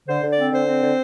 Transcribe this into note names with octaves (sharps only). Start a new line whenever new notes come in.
D3 C5
D3
D5
C4
D3 C5
C4
D3